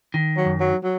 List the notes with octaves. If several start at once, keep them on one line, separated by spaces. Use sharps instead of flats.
D#3
F#3
F#2
F#3
F#3